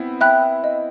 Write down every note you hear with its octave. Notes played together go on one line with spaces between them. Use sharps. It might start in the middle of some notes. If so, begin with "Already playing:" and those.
Already playing: B3 C4 E4
E5 G5 B5 F#6
D#5